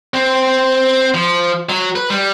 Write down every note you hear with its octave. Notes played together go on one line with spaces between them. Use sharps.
C4
F3
F#3
B4
G3